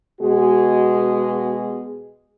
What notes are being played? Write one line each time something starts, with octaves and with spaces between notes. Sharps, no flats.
B2 G#3 F#4 G#4